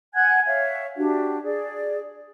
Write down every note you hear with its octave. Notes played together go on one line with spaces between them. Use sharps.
F#5 G#5 F#6 G#6
C#5 E5 F5
D4 F#4 G4
G#4 D5